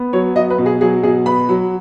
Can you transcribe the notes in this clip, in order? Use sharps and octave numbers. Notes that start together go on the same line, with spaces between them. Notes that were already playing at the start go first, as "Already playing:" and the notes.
Already playing: B3
F#3 C#5
F#3 D#5
B4
B2
G#4
F#3 G#4
B2 G#4
B3 B5
F#3